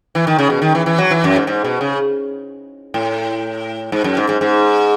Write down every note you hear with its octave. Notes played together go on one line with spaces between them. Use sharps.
E3
D#3
C#3
B2
D#3
E3
E3
F#3
E3
F#2
G#2
G#2
B2
C#3
A2
G#2
F#2
G#2
G#2
G#2